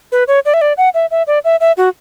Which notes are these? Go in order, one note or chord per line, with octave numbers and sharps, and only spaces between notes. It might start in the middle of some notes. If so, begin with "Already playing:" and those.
B4
C#5
D5
E5
D5
F#5
E5
E5
D5
E5
E5
F#4